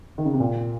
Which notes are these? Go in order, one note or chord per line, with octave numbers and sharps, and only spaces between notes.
D#3
C#3
C3
A#2